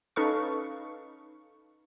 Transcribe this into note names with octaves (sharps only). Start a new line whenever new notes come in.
C#4 D#4 A4 B4 F5 C#6